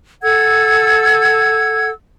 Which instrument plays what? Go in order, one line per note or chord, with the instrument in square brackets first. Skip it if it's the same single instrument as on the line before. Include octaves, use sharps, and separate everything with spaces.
[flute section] A4 F#5 E6 G#6